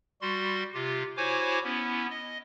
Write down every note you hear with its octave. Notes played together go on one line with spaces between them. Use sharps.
G3 F#4 C6
C3 F4 G4
E4 F#4 C5 C#5 G#5 D6
B3 C#4 E4
D#5